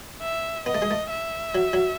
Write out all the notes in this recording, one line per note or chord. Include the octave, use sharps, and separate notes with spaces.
E5
B3 D#5
A3
G#3
A3
E5
F#3
F#3